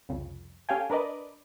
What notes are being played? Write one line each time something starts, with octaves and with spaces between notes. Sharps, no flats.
C2 F2 C#3
C#4 G4 A4 F5 G5 G#5
D4 A#4 B4 D5 D#5